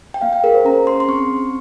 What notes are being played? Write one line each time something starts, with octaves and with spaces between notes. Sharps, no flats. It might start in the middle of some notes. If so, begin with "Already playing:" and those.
G5
A#3 F5
G5
G#4 A#4
C5
C#4 A#5
G#4 C6
C6
C4 C#6
C4